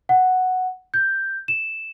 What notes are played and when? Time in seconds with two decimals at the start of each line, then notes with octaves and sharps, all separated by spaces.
0.09 F#5
0.94 G6
1.48 E7